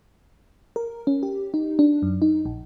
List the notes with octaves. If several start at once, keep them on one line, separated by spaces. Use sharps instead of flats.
A#4
C#4
G4
D#4
D4
F#2
D#4
A#1